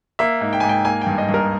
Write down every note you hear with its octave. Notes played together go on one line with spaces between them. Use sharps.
A#3 E5
G#2
G5
G#2 G#5
G5
A#3 G#5
G2 G5
D#5
G2
A#4